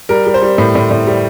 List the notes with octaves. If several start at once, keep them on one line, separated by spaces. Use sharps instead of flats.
G3 A#4
G3
C5
G3
A2
A2
A2
G3